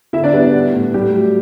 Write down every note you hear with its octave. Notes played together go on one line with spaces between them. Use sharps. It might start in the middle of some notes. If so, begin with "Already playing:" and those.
D3 E4 E5
D4 D5
G3 B3 B4
B3
A2
A2 G3 G4
F#3